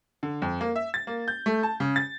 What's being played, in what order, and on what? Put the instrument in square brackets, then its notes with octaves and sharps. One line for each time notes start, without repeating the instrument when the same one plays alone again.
[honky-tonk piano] D3
F2
A#3
E5
A6
A#3
G6
A3
A5
C#3
A6